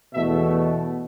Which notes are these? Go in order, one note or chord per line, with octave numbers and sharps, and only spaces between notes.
E2 B2 A3 E5